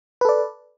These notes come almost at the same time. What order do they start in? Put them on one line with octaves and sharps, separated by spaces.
B4 A4 D5